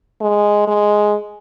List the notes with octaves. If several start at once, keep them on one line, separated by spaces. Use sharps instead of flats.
G#3
G#3